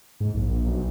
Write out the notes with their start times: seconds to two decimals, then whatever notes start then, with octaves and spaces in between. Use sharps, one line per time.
0.20 G#2
0.35 A#1
0.66 B1